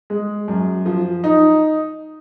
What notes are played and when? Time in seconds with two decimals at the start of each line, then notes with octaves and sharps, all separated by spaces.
0.10 G#3
0.48 F#2
0.86 F3
1.24 D#4